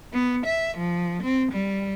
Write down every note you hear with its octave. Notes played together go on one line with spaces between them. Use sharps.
B3
E5
F3
C4
G3